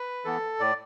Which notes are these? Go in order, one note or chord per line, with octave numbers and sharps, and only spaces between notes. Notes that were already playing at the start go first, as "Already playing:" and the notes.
Already playing: B4
E3 B3 A4
A2 D5